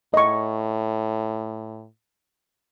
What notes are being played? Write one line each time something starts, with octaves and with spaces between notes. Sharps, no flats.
A2 D#5 C#6